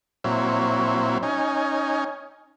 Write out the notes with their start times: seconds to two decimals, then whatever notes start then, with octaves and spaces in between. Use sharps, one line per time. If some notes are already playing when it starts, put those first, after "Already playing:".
0.24 A#2 F#3 C4 E4 C#5
1.23 C#4 D#4 G#5